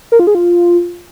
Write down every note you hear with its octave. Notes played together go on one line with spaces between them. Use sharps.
A#4
F4
G#4
F4